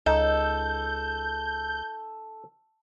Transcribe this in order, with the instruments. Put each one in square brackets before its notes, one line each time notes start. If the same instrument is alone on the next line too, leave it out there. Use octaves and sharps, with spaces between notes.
[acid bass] C#2 [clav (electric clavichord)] D#4 [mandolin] A4 [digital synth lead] G6